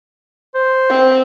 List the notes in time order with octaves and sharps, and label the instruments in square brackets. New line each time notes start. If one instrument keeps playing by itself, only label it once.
[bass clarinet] C5
[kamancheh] C4